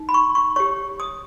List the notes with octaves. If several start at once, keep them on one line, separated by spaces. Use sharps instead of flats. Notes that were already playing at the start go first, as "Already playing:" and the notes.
Already playing: D#4
B5
C#6
C#6
G4 C#5 C#6
D#6